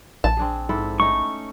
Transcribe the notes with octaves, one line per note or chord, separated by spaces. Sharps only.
A#1 A5
C4 D4 G#4
G#2 E4 A4
A3 C#4 D#4 C#6